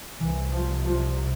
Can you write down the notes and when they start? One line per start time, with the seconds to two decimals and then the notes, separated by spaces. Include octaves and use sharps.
0.20 C2 C3 E3
0.52 F3
0.85 F3